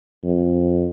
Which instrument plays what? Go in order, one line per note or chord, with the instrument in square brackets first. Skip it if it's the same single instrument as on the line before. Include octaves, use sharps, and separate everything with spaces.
[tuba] F2